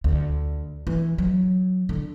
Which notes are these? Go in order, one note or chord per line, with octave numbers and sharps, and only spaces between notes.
D2
E3
F#3
D3